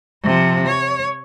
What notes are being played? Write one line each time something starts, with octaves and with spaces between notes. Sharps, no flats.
C3 F3
C#5